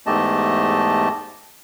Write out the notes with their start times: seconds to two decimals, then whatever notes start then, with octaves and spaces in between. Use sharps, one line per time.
0.06 E2 G#2 A3 G4 D#5 A5